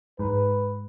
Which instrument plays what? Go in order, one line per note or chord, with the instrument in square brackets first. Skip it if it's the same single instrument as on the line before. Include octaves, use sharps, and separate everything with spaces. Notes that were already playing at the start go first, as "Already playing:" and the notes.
[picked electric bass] G#2 [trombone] B4